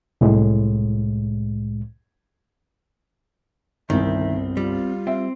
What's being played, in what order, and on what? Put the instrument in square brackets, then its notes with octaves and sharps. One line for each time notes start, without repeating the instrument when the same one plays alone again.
[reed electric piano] C2 A2 G#3
[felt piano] G1 C2 [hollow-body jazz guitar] D#3 [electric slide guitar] C4 [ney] E5
[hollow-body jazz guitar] G3 [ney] F4
[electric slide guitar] C4 [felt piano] E5